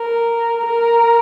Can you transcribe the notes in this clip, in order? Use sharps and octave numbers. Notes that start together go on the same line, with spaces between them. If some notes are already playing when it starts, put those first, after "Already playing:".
Already playing: A#4
A#4